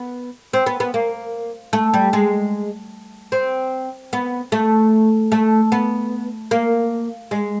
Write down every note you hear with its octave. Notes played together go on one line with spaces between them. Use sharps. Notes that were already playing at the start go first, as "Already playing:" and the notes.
Already playing: B3
C4
B3
B3
A#3
A3
G3
G#3
C4
B3
A3
A3
B3
A#3
G#3